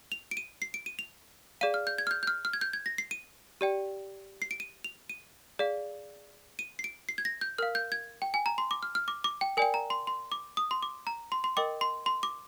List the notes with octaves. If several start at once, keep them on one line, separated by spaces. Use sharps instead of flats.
F7
D7
D#7
C7
D7
D#7
F7
G#4 D5 F5 D#7
F6
G6
G#6
F6
G6
G6
F6
F6
G#6
G6
G#6
A#6
C7
D#7
G4 D5 G5
C7
D7
D#7
F7
D#7
G#4 D5 F5
D#7
C7
D7
C7
G#6
A#6
G6
A#4 F5 F6
G6
G#6
G5
G#5
A#5
C6
D6
F6
F6
D6
D6
G5
A#4 D5 G5 G#5
A#5
C6
C6
D6
D#6
C6
D6
A#5
C6
C6
A#4 D#5 G5 D6
C6
C6
D6